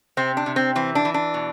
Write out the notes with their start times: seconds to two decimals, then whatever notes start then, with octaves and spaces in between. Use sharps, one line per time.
0.17 C3 C4
0.37 D4
0.46 C3
0.56 C4
0.75 E3 C4
0.95 D4
1.05 E3
1.14 D4
1.34 B2